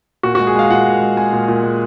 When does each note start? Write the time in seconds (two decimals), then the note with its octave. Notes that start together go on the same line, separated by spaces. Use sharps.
0.23 A#2 F#4
0.35 G#3 F#4
0.47 G#4
0.55 G#3 F5
0.70 A#2 F#5
0.86 A#2
1.01 G#3
1.17 G#3 G#5
1.33 A#2
1.48 A#2
1.63 G#3